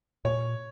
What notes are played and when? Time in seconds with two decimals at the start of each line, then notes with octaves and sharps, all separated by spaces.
0.25 A#2 C#5